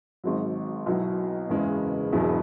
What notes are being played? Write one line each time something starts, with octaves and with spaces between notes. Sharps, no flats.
G#1 G#2 F#3
B1 B2 F#3 E4
F#1 E2 C#3 G#3 E4
E1 E2 B2 F#3 E4